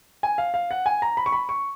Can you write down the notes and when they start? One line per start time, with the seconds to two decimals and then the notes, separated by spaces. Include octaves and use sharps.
0.23 G#5
0.38 F5
0.54 F5
0.71 F#5
0.86 G#5
1.02 A#5
1.17 B5
1.26 C#6
1.32 B5
1.49 C#6